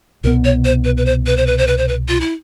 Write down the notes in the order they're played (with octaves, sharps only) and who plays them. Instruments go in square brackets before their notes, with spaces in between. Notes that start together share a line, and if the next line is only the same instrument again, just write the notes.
[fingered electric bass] C2 B2 F#3 B3 [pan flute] A#4
[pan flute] C#5
C5
B4
B4
C5
B4
C5
B4
C5
B4
C5
B4
F4
E4